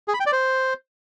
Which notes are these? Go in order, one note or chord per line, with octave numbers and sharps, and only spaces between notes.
G#4
B5
G5
D5
C5